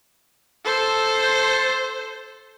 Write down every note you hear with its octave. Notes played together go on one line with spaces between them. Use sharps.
A4 C5